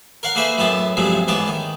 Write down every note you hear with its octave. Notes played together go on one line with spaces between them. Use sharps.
A#4 C#5 F5 F#5 A#5
A3 A#3 G#4 B4 C5 E5
F#2 A2 B3 E5 A5
G2 C3 F3 F#3 G#3 A3
A1 G#2 B3 C#5 A5 D6
D#3